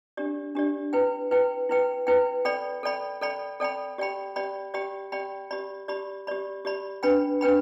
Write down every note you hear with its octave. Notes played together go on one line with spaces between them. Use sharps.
D4 G4 D5
D4 G4 D5
E4 B4 G5
E4 B4 G5
E4 B4 G5
E4 B4 G5
A4 D5 G5 B5
A4 D5 G5 B5
A4 D5 G5 B5
A4 D5 G5 B5
G4 D5 G5 B5
G4 D5 G5 B5
G4 D5 G5 B5
G4 D5 G5 B5
G4 D5 B5
G4 D5 B5
G4 D5 B5
G4 D5 B5
D4 B4 G5 B5
D4 B4 G5 B5